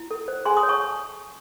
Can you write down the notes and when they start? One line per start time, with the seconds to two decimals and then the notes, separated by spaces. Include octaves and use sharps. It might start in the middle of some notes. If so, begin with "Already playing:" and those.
Already playing: E4
0.11 A4
0.28 C5
0.45 G#4 G#5 C6
0.57 C6 D#6
0.63 C#5
0.69 A5 C#6